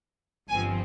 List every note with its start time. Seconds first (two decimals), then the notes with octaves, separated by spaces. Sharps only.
0.50 G1 G2 F3 C4 G#5